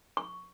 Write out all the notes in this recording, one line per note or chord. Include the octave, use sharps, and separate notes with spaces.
C#6